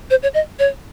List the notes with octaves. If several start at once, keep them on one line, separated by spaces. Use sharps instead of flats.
C5
C#5
D#5
C#5